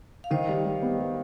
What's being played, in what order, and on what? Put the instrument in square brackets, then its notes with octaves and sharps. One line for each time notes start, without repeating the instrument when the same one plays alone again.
[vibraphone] F5
[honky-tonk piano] D#3 [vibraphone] C5 D#5
[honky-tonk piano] G3
G3
B3
G3